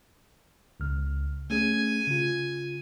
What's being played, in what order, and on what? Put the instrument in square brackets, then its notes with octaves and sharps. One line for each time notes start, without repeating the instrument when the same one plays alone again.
[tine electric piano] C#2 C#3 F6
[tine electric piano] A3 C#4 G#4 [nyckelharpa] G#5
[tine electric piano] C#3 F4